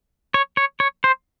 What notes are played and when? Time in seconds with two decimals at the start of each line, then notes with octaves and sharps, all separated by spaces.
0.34 C#5
0.57 C#5
0.80 C#5
1.04 C5